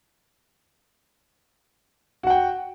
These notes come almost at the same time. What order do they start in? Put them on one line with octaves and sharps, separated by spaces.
F#4 F#5 G5